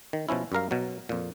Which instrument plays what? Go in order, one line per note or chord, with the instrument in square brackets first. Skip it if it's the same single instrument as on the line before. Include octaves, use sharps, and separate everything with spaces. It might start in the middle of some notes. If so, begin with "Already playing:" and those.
[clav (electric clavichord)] D#3
B2 F3 C#4 E4
F#2 G3 A#4 F5
B2 F#3
F2 A#2